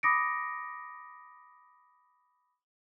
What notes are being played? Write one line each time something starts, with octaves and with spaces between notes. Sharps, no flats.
B5 D6 D#6 A#6 C#7 D7